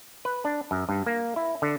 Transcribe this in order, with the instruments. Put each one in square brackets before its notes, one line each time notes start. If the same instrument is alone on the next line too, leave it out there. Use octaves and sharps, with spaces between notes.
[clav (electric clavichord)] B4
D4
F#2
G2
A#3
E4
D3